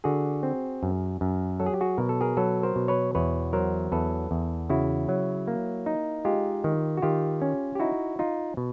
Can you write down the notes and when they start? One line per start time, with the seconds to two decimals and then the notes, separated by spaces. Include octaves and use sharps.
0.04 D3 F#4 G#4
0.43 C4
0.83 F#2
1.21 F#2
1.60 F#3 A4
1.66 G#4
1.74 G4
1.81 F#4 G#4
1.98 B2 A#4
2.09 A4
2.21 G#4 A#4
2.37 F#3 A4 B4
2.63 A#4 C5
2.76 B2
2.88 B4 C#5
3.15 E2 B4 C#5
3.53 F#3 A#4 C5
3.92 E2 A4 B4
4.31 E2
4.70 C#3 E4 F#4
5.09 F#3
5.48 A#3
5.86 D#4
6.25 G#3 F4 G4
6.64 D#3
6.97 F#4
7.02 D#3 F4 G4
7.42 C#4
7.75 G4
7.80 D#4 E4 F#4
8.19 D#4 F4
8.57 B2